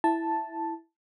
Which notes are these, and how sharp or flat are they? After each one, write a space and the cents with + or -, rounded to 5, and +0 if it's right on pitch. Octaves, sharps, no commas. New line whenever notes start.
E4 +0 A5 +0